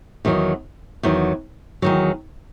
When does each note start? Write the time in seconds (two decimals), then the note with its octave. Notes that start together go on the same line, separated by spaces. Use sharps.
0.25 E2 D#3 F#3
1.03 E2 D#3 F#3
1.82 E2 D#3 F#3